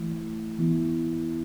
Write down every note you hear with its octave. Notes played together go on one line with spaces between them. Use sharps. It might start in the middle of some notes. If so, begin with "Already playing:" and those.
Already playing: E3 A3 E4
E3 B3 E4